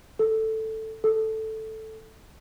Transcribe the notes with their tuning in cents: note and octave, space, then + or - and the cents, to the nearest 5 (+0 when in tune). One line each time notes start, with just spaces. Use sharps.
A4 +5
A4 +0